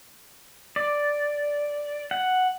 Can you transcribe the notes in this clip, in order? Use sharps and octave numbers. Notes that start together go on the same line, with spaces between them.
D5
F#5